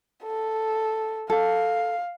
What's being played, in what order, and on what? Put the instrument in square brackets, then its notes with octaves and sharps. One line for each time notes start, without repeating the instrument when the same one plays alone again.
[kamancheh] A4
[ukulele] A4 [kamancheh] F5